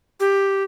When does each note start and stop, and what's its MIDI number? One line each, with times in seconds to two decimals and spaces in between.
0.20 0.63 67